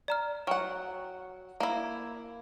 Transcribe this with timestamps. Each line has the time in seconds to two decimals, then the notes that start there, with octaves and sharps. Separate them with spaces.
0.08 D5 A#5 F6
0.47 F#3 F#5 G5 C#6 F6
1.60 A#3 E4